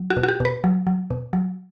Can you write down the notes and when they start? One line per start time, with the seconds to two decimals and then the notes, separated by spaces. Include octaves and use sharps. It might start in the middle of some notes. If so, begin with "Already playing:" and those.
Already playing: F#3
0.10 F#4
0.17 B2
0.23 F#4
0.28 G4
0.40 B2 B4
0.64 F#3
0.87 F#3
1.10 B2
1.33 F#3